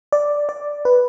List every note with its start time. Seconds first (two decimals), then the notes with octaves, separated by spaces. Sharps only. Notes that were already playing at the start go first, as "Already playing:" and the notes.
0.12 D5
0.49 D5
0.85 B4